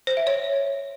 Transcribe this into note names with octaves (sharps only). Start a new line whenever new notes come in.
C5
E5
C#5